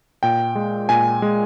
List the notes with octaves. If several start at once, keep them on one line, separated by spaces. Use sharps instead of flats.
A#2 G5
G#3
A#2 G#5
G#3